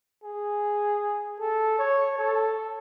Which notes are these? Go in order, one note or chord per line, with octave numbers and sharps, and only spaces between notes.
G#4
A4
C#5
A4